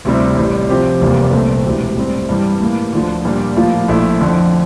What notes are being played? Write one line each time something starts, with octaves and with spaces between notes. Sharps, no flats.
D2 C3 G3 C4 E4
A1 A2 G3
C3 F3 C4 G4 C5
F1 E2 C3 G3 A#3
C2 A#2 A3 C4
E1 D2 C3 E3
A2 G3 C4
G2 E3 G3
A2 E3 A#3
D2 D3 F3
A#2 G3 A#3 D4
A2 F3 A#3 F4
A#1 A#2 A3 E4
F2 D3 F3